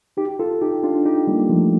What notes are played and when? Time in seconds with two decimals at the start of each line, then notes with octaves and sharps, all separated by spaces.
0.17 D#4 G4
0.40 F4 A4
0.62 D#4 G4
0.84 D4 F4
1.05 D#4 G4
1.27 G3 A#3
1.49 F3 A3